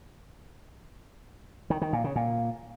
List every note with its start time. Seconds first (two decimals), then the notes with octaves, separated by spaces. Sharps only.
1.70 D#3
1.82 D#3
1.93 A#2
2.04 C#3
2.16 A#2